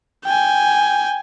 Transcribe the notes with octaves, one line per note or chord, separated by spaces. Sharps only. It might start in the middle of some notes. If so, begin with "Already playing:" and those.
G5 G#5